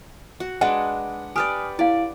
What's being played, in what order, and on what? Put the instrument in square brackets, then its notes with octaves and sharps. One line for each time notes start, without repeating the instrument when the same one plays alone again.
[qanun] F#4
[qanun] G#3 D4 B4 [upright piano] F#5
[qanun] G4 B4 D5 [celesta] G#5 D#6 F6
[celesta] E4 F5 [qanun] D5